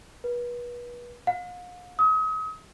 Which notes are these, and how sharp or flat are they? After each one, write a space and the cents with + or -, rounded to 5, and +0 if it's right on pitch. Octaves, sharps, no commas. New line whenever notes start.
B4 -30
F5 +45
D#6 +40